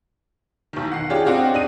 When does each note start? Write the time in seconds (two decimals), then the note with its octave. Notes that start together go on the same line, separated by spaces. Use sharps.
0.73 B1 D#3
0.92 F#5 C7
1.10 C#4 D4 F4 G4 G#4
1.25 C4 D4 F#4 G4 D#5 F5
1.54 D4 D#4 D#7